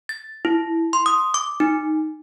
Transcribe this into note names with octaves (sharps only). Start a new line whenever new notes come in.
A6
E4
C6
D#6
D6
D#4